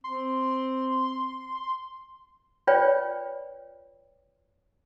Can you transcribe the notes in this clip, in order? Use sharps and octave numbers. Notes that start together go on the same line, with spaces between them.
C4 C6
F4 B4 C#5 D5 G5